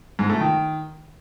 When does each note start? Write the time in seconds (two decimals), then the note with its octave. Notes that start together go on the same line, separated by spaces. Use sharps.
0.19 G#2
0.29 A3
0.40 D#3